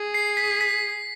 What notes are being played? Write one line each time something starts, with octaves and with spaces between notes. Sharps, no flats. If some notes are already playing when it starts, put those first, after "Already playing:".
Already playing: G#4
C7
B6
B6